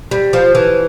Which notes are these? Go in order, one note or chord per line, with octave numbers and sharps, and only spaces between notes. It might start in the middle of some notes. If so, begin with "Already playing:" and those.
G3
F3
E3